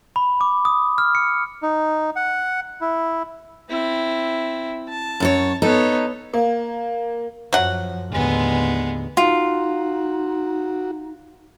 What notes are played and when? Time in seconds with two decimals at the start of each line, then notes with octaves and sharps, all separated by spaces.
0.16 B5
0.41 D6
0.65 D#6
0.98 F6
1.15 C#7
1.63 D#4
2.16 F#5
2.81 E4
3.70 C4 E4
4.89 A5
5.20 F#2 A4 C#5
5.62 B3 D#4 A4 C#5
6.33 A#3
7.53 F#2 F3 F#3 F#5
8.12 D#2 A2 D3 G#3 B3
9.17 D#4 F4 F#4